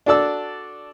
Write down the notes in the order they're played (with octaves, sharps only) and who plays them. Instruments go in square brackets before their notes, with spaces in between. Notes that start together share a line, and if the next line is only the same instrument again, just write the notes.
[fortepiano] D4 F#4 A4 D5 E6